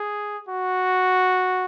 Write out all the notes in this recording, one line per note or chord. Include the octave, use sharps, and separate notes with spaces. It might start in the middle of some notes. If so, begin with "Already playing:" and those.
Already playing: G#4
F#4